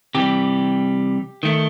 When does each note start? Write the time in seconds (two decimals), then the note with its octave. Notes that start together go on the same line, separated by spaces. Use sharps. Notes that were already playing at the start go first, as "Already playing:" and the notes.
0.15 C3 E3 G3 G4
1.43 D#3 A3